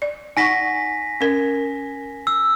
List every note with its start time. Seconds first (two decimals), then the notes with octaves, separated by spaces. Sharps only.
0.02 D5
0.37 D#4 F#5 G#5 C#6 A#6 B6
1.21 C#4 A#4
2.27 E6